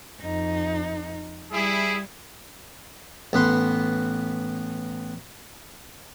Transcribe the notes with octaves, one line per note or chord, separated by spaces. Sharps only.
F2 D#4
G3 E4 G#4
A1 B3 B4 C6